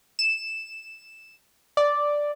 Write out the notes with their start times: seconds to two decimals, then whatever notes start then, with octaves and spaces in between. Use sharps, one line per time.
0.19 E7
1.77 D5